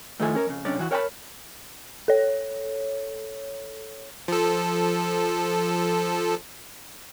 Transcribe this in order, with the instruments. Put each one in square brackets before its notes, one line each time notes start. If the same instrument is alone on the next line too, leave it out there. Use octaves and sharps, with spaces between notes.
[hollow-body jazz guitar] A2 D#3 F3 A4 G#5
C#4 A#4
F2 C#3
B1 C3 C#4 D4 D5
E3 F#4
A#4 C#5 F#5 G5 A5 B5
[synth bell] A4 C#5
[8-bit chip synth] F3 A4